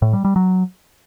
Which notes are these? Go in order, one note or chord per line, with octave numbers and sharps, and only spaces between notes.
A2
G3
G3
F#3